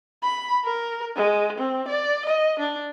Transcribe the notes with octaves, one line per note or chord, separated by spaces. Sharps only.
B5
A#4
G#3
C4
D5
D#5
D4